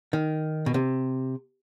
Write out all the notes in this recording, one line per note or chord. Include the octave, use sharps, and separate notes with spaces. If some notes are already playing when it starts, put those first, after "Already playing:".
D#3
B2
C3